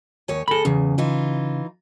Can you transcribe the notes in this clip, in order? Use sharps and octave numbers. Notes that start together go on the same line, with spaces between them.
D#2 C#5 G#5
D2 G#4 A4 B5
E2 C#3
E3 D#4 F4